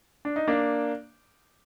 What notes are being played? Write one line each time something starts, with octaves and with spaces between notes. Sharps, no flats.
D4
D#4
A#3 D4